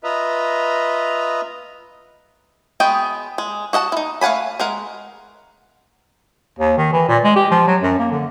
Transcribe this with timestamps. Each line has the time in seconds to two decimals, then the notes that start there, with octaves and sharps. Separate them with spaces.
0.04 F4 B4 D#5 E5 A#5
2.80 G#3 B3 F#4 D#5 G5
3.38 G#3
3.73 F#4 D#5 F#5 A5
3.92 D#4 E4
4.21 A3 F5 F#5 G#5 B5
4.60 G#3 A#4 F#5
6.59 D#2
6.78 D#3
6.93 E3
7.09 A#2
7.24 G#3
7.36 G4
7.51 F3
7.68 F#3
7.82 F#2
7.99 A#3
8.11 D3